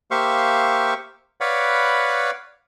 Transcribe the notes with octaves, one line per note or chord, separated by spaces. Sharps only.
A#3 G4 C5 E5 F5 C#6
B4 C#5 D5 F5 F#5 B5